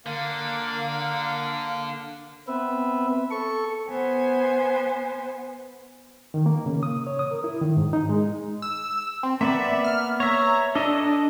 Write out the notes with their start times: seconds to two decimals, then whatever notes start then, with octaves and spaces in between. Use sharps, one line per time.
0.06 D3 A#3 F5
2.48 B3 C4 B4 E5
3.31 A4 C#6
3.89 B3 C5 G#5
6.34 D#3
6.46 A#3
6.66 C#3
6.83 D#6
7.07 C#5
7.19 D#6
7.31 A#4
7.44 E4
7.61 D#3
7.77 G#2
7.93 D#4
8.09 G#3
8.62 E6
9.23 C4
9.41 A#3 B3 D5 E5
9.84 F6
10.20 C#5 E5 A#5
10.75 D4 A4 D#5